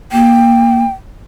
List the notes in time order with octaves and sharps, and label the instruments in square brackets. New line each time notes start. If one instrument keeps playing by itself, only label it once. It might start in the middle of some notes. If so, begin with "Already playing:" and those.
[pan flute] A#3 [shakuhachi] G5